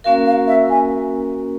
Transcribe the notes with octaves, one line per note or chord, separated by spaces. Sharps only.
A#3 C#4 F#4 A#4 F5
F5
E5
G#5